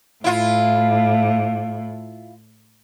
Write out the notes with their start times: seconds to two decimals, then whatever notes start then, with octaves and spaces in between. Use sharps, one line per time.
0.24 A2 E4 F4